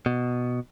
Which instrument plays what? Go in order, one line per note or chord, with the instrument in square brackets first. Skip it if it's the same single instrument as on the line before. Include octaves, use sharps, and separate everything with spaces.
[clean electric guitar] B2